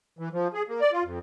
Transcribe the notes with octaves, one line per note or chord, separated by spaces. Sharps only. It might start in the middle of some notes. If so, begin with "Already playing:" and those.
E3
F3
G#4
A#3
D5
F4
F2